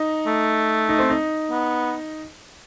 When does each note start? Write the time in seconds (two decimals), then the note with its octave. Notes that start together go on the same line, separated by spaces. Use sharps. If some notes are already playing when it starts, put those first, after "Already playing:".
Already playing: D#4
0.26 A3
0.89 D#4
0.99 C4
1.10 D#4
1.51 B3